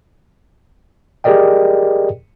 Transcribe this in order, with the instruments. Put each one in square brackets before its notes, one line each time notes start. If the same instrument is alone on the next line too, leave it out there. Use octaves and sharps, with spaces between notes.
[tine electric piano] G4 G#4 A#4 D5 D#5 G5